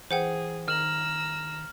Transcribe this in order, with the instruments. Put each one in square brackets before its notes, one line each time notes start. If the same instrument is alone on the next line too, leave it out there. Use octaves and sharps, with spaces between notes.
[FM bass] E3 [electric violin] G#4 [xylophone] C5 F#5 G5
[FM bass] D#3 [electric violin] A#5 E6 [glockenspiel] F6 F#7